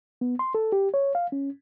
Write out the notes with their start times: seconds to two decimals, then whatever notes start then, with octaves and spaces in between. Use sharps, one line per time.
0.21 B3
0.39 C6
0.54 A4
0.72 G4
0.94 C#5
1.15 F5
1.32 C#4